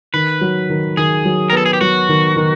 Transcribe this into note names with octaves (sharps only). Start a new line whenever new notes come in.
D#3 B4
F#3
D#3
D#3 G#4
F#3
A#4
B3 A4
G#4
G4
F#3 F#4
D#3
D#3